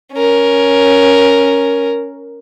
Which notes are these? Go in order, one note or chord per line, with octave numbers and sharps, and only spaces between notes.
C#4 A#4